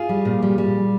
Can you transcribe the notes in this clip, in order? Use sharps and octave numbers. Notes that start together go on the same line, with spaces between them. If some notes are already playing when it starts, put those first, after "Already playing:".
Already playing: F4 G#4
G3
A#2
G3
G3